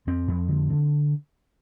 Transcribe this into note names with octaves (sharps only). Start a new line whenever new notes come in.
F2 C4
F2
D3
D3